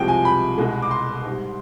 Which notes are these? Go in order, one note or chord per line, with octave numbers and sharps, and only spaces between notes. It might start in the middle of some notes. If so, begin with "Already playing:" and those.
Already playing: C2 C3 F3 G#3 G5
G#5
B5
C2 B2 G#3
D6
C6
G#2 G3